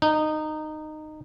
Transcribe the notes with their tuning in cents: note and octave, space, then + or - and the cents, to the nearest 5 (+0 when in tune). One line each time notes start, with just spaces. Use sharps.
D#4 -15